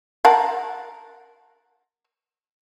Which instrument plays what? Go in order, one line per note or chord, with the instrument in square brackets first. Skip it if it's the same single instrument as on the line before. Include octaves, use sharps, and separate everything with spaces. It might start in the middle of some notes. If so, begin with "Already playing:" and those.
[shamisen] A#4 F#5 A5